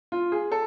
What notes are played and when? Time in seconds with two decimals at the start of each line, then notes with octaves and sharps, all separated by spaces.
0.12 F4
0.32 G#4
0.52 A4